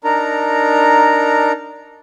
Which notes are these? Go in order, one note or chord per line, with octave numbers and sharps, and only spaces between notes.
D4 D#4 A#4 A#5